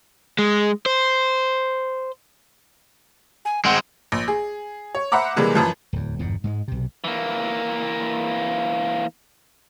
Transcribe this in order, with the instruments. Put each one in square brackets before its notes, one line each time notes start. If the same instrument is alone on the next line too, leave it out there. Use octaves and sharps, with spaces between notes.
[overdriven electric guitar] G#3
C5
[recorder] G#5
[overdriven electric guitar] G#3 C4 [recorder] F#5
[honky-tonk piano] A#1
G#4
C#5
C5 E5 F#5 A#5 B5 D6
C3 E3 G3 G#3 A#3
F#2 E3 F3
[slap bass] D1 E2
G1 E2 G#2 B2
G#2 G3 G#3
B1 C3
[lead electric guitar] E3 A#3